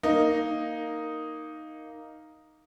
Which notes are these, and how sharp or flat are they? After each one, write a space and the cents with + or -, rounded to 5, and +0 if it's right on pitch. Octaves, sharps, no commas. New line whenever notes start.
A#3 +0 D#4 +0